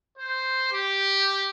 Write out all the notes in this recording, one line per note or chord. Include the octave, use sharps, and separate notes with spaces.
C5
G4